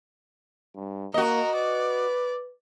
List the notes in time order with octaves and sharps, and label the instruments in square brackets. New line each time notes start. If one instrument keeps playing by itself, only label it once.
[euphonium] G2
[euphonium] A#3 [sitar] F#4 D#5 [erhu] A#4
[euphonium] B4 [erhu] D5